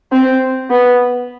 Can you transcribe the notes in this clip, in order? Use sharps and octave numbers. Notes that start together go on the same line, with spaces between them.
C4
B3